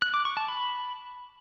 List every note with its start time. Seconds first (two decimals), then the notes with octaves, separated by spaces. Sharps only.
0.02 F#6
0.14 D6
0.25 C#6
0.37 A5
0.48 B5